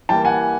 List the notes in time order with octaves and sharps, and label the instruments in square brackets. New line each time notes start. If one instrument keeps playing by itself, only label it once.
[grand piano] E3 G3 A#3 G5 A5
F#5 G#5